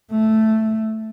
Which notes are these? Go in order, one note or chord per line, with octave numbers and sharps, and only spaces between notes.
A3